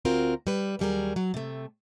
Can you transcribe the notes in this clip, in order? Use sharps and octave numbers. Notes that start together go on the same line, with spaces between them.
D2 C4 F4 F#4 A#4
G3 B4
D#2 F#3 G3 G#4 A#4
F#3
C3 A3